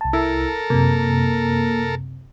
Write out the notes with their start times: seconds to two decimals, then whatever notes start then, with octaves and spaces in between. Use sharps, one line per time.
0.01 C2 A5
0.13 E4 A4 A#4
0.70 F#2 C3 A#3